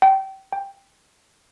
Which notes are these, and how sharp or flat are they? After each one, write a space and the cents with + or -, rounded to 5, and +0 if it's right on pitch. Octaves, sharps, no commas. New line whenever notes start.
G5 -25
G5 +10